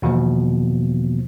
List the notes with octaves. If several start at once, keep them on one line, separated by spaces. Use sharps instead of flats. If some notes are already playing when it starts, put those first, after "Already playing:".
E2 B2 D#3 F3 A#3